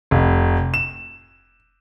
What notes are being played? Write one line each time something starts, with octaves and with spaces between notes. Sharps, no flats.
F1
E7